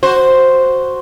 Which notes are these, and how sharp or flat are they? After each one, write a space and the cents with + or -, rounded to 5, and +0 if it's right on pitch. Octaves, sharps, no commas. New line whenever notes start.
F#4 +0 C5 +0